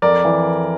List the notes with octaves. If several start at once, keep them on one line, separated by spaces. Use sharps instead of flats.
F2 A#4 D5
E3